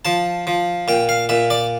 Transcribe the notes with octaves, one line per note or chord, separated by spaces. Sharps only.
F3 A5
F3
A#2 G5
F5
A#2 E5
D5